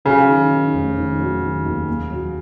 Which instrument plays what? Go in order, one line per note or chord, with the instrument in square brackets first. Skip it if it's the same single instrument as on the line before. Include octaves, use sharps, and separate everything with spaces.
[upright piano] C#3 [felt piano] F#3
[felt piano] D#3
D#3
F1
D#3
F#3
D#3
D#2
A#3
F#3